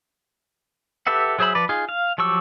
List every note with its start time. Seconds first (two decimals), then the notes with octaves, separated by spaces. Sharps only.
1.07 G4 A4 B4 E5 F#5
1.39 F#3 G#4 C5 E5 B5
1.55 F3 B4 D5
1.69 D#4 F4 G#4
1.89 F5
2.18 F3 F#3 G4 C#6 E6